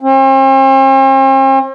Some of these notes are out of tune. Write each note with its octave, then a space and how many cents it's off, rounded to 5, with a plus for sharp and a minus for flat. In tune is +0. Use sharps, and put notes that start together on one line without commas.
C4 +45